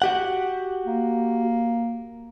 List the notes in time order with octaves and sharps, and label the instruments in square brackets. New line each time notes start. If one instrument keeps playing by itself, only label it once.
[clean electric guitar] F#4 G4 F#5
[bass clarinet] A#3